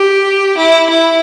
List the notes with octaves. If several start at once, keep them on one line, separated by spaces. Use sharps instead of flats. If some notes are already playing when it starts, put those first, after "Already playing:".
Already playing: G4
E4
E4